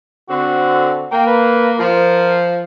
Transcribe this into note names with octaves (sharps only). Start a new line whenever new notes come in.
D3 C4 F#4
A#3 G5
B4
F3 A#4